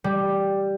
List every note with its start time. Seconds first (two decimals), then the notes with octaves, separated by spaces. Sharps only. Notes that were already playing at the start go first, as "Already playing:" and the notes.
0.04 G3